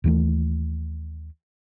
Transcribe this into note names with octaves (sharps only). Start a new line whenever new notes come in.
D#2 E3 A3